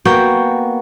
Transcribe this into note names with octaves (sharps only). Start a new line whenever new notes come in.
A#3 B3 F#4 G5